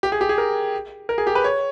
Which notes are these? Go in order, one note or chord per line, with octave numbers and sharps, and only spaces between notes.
G4
G#4
G4
G#4
A#4
A#4
G#4
G4
B4
C#5